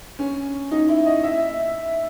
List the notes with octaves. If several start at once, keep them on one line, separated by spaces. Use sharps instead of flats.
C#4
D#4
E4
D#5
E5